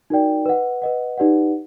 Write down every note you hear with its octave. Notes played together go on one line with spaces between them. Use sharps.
D#4 F#4 A#4 D5 G5
B4 D#5 F#5
B4 D#5 F#5
D#4 G4 B4 D5 F#5